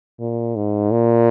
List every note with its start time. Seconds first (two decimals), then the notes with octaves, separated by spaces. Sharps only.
0.19 A#2
0.56 G#2
0.91 A#2